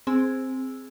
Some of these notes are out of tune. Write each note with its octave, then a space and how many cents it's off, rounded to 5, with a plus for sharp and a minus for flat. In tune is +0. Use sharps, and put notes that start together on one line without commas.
C4 +0 G#4 +0 E6 +0